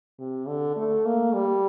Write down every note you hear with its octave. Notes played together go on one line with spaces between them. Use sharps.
C3
D3
A3
A#3
G3